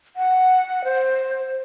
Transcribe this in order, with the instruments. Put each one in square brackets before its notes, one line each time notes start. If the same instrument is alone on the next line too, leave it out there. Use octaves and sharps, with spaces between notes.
[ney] F#5
C5